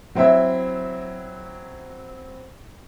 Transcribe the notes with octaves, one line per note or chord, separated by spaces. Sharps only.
F#3 C4 E4 E5